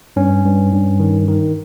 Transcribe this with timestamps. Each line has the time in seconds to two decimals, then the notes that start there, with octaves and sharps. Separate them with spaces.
0.16 G2 C#4
0.44 G2
0.73 G2
1.00 D#3
1.28 D#3